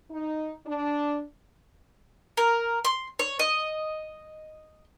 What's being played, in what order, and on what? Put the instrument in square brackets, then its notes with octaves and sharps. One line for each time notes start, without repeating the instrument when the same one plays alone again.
[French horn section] D#4
D4
[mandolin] A#4
C6
C#5
D#5